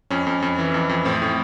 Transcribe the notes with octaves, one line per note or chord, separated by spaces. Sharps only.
F2 C#4
F2
F2
E3
F2
F2
A2 C4
A2